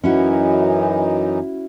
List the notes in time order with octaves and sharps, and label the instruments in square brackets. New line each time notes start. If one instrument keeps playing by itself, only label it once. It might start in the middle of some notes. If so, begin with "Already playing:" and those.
[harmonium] F#2 E3 D#4 [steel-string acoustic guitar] C#4 E4 F#4